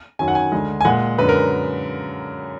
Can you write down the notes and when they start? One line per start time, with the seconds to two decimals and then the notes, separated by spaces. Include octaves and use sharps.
0.19 F#2 D#3 F#3 G#5
0.28 F#5
0.35 G#5
0.52 D2 D3 G#3
0.81 G#5
0.85 A#2 G#3 F#5
1.18 F#2 D3 G#3 B4
1.29 A#4